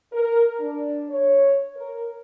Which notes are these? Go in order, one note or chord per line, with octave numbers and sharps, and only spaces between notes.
A#4
D4
C#5
A#4